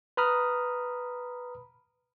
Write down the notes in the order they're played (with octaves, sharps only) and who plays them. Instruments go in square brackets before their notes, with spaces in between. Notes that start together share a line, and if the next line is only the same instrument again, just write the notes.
[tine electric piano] B4 A#5 B5 D#6 F6